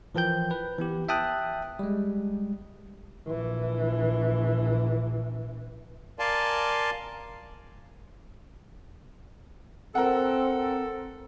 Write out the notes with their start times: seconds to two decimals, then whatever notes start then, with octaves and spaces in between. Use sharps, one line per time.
0.15 E3 F3 A#4 G5 G6
0.51 B4
0.78 E3 B3 G4
1.09 E5 G5 A5 D#6 F#6
1.79 G3 G#3
3.27 A#1 E3
6.19 A#4 D5 F5 G#5 A5 C6
9.95 C4 A4 A#4 F#5